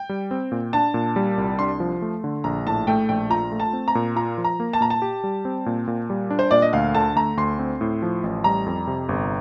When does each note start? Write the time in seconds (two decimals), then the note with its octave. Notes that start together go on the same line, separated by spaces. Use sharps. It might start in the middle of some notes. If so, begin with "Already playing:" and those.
Already playing: G5
0.09 G3
0.31 C4
0.52 A#2
0.73 D4 A5
0.94 A#2
1.16 G3
1.38 C2
1.59 D4 C6
1.80 F3
2.02 A3
2.24 D3
2.44 A#1 A#5
2.67 A2 A5
2.87 A3 G5
3.09 A#1 G5
3.30 F4 A#5
3.52 A3
3.60 A5
3.73 C4
3.88 A#5
3.95 A#2
4.16 F4 A#5
4.38 F3
4.44 A#5
4.60 A#3
4.73 A5
4.80 A#2 A#5
4.90 A5
5.02 G4
5.24 G3
5.45 C4
5.66 A#2
5.87 A#2
6.10 G3
6.30 D4
6.39 C5
6.51 A#2 D5
6.62 D#5
6.73 D2 F5
6.95 D3 A5
7.16 A3 A#5
7.37 D2 C6
7.59 C4
7.81 A2
8.02 F3
8.24 A1
8.44 G3 A#5
8.66 F2
8.87 C3
9.09 G1